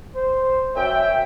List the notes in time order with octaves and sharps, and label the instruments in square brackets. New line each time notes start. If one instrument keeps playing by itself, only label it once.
[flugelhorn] C5
[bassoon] F#2 [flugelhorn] E5 [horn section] G5